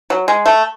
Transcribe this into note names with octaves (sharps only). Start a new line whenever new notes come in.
F#3
G#3
A3